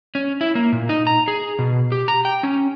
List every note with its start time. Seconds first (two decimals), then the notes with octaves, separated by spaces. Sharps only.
0.15 C#4
0.41 E4
0.55 A#3
0.73 A#2
0.89 D#4
1.07 A#5
1.28 G#4
1.59 B2
1.92 G4
2.08 A#5
2.25 G5
2.43 C#4